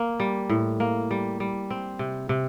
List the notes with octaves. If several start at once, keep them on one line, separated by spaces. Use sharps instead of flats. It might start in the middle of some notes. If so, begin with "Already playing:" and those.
Already playing: A#3
G3
A2
A#3
G3
G3
C4
C3
C3